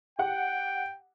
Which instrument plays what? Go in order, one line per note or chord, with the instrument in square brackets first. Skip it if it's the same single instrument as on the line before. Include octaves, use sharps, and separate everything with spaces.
[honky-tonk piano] G4 F#5 [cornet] G5